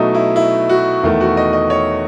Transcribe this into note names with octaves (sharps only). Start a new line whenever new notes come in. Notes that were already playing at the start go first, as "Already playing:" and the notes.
Already playing: B2 F#3 A3 D#4 E4
E4
E4
F#4
E2 D#3 A3 E4
F#4
D#5
D#5
C#5